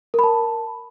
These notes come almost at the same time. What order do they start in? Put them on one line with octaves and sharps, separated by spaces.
A#4 B5 A5